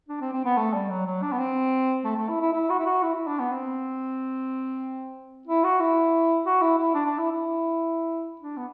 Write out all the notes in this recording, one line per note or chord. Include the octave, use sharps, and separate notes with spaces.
D4
C4
C4
B3
A3
G3
F#3
F#3
D4
B3
C4
A3
A3
E4
E4
E4
F#4
E4
F#4
E4
E4
D4
B3
C4
E4
F#4
E4
F#4
E4
E4
D4
D4
E4
E4
D4
B3